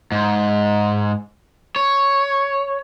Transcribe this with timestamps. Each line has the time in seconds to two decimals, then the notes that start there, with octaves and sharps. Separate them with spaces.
0.12 G#2
1.76 C#5